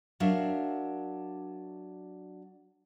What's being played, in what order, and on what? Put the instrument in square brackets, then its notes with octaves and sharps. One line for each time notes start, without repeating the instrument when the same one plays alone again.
[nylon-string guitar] F#3 D4 A#4 E5 F5